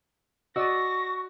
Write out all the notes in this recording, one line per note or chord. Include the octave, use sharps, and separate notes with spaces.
F#4 D5 D#5 C#6 E6 A#6